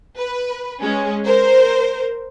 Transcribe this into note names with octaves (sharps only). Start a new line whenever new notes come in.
B4
G#3 C#4
A#4 C5